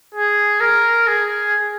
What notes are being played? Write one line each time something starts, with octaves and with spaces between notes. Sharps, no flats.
G#4
A#4
G#4